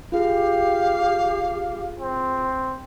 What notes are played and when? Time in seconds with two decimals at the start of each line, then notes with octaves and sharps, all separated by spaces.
0.12 F4 G4 G#4 F5
2.00 C4